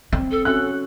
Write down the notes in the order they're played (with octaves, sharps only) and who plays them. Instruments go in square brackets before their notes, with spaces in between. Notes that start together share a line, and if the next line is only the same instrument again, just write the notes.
[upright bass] C4
[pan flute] A4
[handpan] C#4 F#4 [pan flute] A4 [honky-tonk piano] F#6